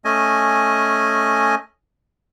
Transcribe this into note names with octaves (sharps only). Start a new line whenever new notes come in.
A3 C#4 D#5 G#5